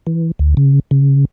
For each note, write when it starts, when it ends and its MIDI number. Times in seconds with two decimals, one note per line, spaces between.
0.07 0.31 52
0.39 0.54 38
0.57 0.80 49
0.91 1.25 49